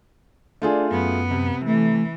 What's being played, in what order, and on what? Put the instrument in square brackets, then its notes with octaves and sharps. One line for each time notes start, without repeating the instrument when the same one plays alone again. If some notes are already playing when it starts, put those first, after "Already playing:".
[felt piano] A3 F4 G#4 [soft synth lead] D4
[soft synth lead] F#2 [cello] B3
[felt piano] C3
[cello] E3 [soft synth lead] A3